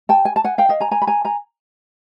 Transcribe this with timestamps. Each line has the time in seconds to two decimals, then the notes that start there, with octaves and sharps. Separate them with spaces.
0.09 G5 A5
0.25 G#5
0.36 A5
0.44 F#5 G#5
0.58 F5 G5
0.69 D#5 F5
0.80 G#5 A#5
0.91 G#5 A#5
1.02 B5
1.07 G#5 A#5
1.25 G#5 A#5